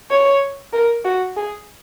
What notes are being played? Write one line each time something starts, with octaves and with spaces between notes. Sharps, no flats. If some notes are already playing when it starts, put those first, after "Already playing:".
C#5
A#4
F#4
G#4